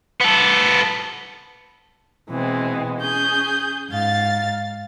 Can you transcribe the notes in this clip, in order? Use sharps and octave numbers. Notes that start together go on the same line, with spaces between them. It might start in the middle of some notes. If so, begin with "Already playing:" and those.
B3 A4
B2 E3 G#3 C4
C#4 G#4 G6
G#2 F5 A6